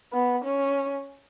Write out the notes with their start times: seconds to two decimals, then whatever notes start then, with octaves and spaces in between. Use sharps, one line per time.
0.13 B3
0.45 C#4